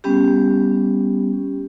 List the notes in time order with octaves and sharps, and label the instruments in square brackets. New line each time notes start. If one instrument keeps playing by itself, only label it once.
[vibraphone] G3 B3 C#4 G4